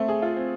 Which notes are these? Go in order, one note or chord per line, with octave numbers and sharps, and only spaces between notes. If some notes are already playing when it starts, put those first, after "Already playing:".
Already playing: A3 C4
G#4
F4
C4